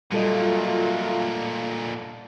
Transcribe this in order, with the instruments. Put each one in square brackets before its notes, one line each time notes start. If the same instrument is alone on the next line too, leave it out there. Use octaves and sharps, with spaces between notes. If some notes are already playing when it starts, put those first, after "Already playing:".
[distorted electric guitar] A#2 D3 [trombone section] F#3 A3 F4 [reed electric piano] G3 A4 D#5